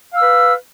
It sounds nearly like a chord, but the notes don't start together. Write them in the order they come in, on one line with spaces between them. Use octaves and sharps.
F5 E6 B4